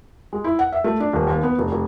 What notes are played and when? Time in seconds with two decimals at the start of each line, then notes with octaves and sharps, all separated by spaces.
0.33 G#3
0.44 E4
0.59 F#5
0.73 E5
0.84 A3
1.00 D4
1.13 D#1
1.27 D#2
1.43 B3
1.59 F1
1.72 F1